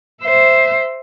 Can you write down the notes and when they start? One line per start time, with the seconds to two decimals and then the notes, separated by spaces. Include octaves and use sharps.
0.22 C5 E5